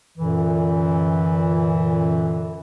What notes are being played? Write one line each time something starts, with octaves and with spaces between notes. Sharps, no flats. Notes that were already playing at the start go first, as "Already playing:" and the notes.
F#2 A#2 D3 E3